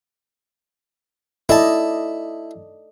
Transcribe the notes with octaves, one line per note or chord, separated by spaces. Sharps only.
E4 A4 D5 D#5 A5